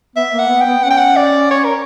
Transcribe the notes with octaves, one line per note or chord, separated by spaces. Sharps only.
B3 E5
A#3
F#5
B3
G5
B3
C#4 F#5
G5
F#5
D5
C#5
A#4